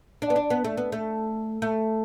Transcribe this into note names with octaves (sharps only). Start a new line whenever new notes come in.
D4
B3
D4
B3
A3
B3
A3
A3